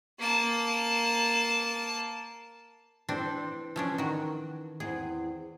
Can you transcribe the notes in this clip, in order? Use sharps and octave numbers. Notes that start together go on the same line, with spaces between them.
A#3 A5
E3 C4 D4 C5
F3 C#4 D4
D#3 F#4
E2 C4 G#4